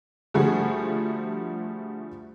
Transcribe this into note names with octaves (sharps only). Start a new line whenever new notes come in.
D3 F3 G3 A3 F#4 G#4